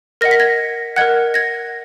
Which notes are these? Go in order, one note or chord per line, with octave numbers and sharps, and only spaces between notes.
A#4 D#5 F#5 A#6
B6
G#6 A#6
A#4 D#5 F#5 F#6 G#6
G#6 A#6